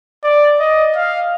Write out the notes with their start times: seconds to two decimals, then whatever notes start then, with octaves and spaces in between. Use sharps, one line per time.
0.24 D5
0.60 D#5
0.96 F5